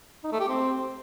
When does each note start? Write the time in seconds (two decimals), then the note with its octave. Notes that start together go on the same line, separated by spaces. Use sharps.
0.24 D#4
0.32 A3
0.40 G4
0.48 C4